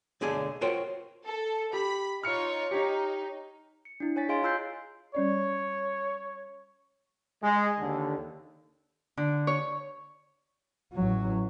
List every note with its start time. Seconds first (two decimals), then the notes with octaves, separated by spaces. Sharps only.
0.21 B1 D3 A3 G#4 F5
0.61 F4 F#4 A#4 C5 C#5 G5
1.25 A4
1.73 G4 B5
2.23 D#4 F4 C#5 F6 C#7
2.71 D#4 G4 C#5
3.85 C#7
4.00 D4 E4
4.16 C#5 G#5 A6 B6
4.29 G#4 D#5 F5 G#5 C6 D7
4.43 F4 A#5 E6 F#6 G6 C7
5.15 G3 C#4 C#5 D5
7.41 G#3
7.79 D#2 D3
9.17 D3
9.47 C#5
10.93 A1 F#3